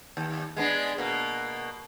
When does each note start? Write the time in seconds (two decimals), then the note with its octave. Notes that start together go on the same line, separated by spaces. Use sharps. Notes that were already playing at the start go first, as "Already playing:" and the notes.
0.17 D#2
0.57 G#3 B3 D4
0.98 B2 A#3